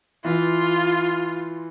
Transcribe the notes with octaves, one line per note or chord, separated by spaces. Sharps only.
E3 F4